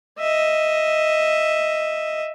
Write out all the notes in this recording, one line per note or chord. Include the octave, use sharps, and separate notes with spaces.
D#5 E5